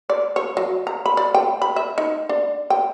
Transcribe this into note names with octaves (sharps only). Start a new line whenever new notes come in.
D5
C#5
F#3
A#5
B5
D5
G5
B5
E5
D#4
D4
G5